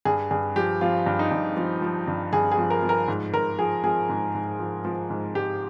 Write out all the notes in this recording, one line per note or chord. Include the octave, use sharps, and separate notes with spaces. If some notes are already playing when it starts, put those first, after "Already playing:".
G2 G#4
G2 G#4
F3 G4
F3 F4
G2
D#4
G2
F3
F3
G2
G2 G#4
G#4
F3
A#4
F3
A#4
G#2
G#2 A#4
F3 G#4
F3 G#4
G#2
G#2
F3
F3
G#2
G#2 G4